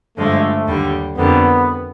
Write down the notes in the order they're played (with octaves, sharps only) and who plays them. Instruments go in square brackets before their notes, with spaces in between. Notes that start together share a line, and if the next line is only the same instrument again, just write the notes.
[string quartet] G2 D3 F3 G#3 [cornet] A3
[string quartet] D#2 D3 G3
[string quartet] F2 D3 G3 A#3 [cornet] B3